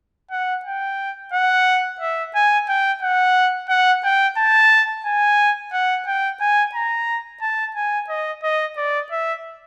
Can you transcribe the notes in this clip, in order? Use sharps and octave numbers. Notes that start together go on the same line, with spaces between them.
F#5
G5
F#5
E5
G#5
G5
F#5
F#5
G5
A5
G#5
F#5
G5
G#5
A#5
A5
G#5
D#5
D#5
D5
E5